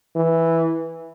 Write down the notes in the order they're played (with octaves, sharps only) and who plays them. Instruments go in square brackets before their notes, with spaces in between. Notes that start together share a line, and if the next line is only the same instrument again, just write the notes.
[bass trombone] E3